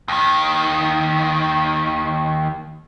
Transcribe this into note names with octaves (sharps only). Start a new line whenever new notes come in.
D#2 D#3